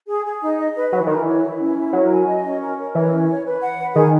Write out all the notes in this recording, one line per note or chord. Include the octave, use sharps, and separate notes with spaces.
G#4
G#4
D#4
D#5
B4
F#3 F#4
E3
D#3 A#4
E3
C#5
E4
C#4
E4
F#3 A#4
G#5
D#5
C#4
A#4
A#4
E3 C#5
C#4
C#5
B4
F#5
B4
D#3 G#4